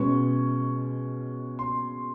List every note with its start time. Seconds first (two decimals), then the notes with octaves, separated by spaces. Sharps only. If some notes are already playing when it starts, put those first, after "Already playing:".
Already playing: B2 G#3 C#4 C#6
1.59 C6